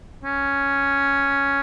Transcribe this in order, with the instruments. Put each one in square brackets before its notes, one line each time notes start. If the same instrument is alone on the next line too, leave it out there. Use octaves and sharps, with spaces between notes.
[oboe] C#4